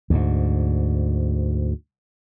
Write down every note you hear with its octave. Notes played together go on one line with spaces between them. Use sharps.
D2 G#2